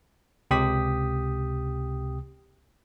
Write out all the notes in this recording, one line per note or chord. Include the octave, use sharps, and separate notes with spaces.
C#2 C3 G4 G5 D#6 B6